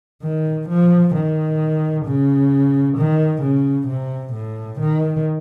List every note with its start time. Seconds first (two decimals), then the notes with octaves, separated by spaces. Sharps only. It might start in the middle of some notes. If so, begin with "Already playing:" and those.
0.23 D#3
0.69 F3
1.15 D#3
2.06 C#3
2.97 D#3
3.42 C#3
3.88 C3
4.33 A2
4.80 D#3